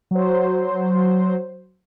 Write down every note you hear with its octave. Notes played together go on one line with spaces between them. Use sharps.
F#3 C5